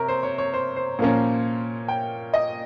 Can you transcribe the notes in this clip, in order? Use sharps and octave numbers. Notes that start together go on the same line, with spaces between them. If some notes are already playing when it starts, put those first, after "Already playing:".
Already playing: C3 A#4 C#5
C5
C#5
C#5
C5
C5
A#2 F3 A#3 C#4
G5
D#5